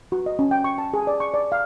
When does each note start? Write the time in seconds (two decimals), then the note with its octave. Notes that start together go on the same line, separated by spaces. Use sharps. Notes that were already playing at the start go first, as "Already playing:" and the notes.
0.12 F#4
0.26 D#5
0.39 C#4
0.51 G5
0.64 C#6
0.78 A5
0.94 G#4
1.07 D5
1.20 C#6
1.34 D5
1.52 F5